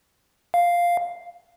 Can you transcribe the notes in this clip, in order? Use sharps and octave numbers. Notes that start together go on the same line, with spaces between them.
F5